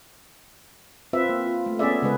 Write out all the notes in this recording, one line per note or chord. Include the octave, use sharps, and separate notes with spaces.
C4 F4 B4 E5
A#3
F4
A3
B3 C#4 G#4 D5 E5
C#3 G#3 B4